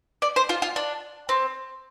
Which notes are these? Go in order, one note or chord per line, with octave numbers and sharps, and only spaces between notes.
D5
C5
F4
F4
D4
C4